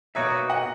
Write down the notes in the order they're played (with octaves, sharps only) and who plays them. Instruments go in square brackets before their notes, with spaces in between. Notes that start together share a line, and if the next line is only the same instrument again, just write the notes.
[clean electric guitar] B2 A#3 D#4 F#4 [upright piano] C#5 E5
[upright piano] D#5 F#5